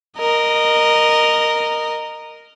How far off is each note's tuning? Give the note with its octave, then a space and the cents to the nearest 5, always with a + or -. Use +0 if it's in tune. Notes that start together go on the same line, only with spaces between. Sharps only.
A#4 +0 D#5 -20